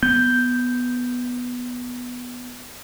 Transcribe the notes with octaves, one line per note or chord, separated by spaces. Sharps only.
B3 G6